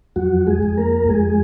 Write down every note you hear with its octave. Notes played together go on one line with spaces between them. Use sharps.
F2 F#3 F#4
G#3 G#4
F2
A#3 A#4
F2 G#3 G#4